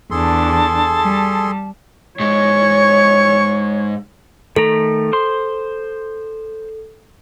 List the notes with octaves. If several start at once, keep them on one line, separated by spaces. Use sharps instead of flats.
E2 D4 G#4 A4 A5 C6
G3
G#2 G#3 C#5 C#6
D#3 A3 A4 A#5
C5 C6